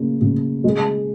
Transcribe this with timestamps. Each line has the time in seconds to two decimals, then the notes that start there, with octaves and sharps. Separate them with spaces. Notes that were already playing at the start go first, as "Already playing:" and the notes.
Already playing: C#3 A#3
0.21 C#3
0.64 G#3